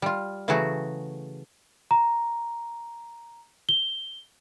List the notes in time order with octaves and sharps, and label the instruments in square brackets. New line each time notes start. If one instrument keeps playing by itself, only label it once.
[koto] G3 F4
C#3 E3 F#3 A3 F#4 G#4
[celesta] A#5
G7